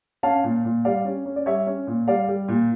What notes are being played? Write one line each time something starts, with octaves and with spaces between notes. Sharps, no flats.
C#4 F5 A5
A#2
A#2
G3 D5 F5
C#4
C#4
D5
G3 C#5 E5
C#4
A#2
G3 D5 F5
G3
A#2